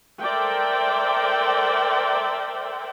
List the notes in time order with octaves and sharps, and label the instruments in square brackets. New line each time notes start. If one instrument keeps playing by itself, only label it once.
[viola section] A4 A#4 C5 D5 E5 G5